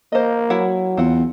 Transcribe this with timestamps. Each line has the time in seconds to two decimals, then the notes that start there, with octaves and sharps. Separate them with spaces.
0.12 A#3 C5 D#5
0.50 F#3 E4 F#5
0.97 E2 C4 F4 F#5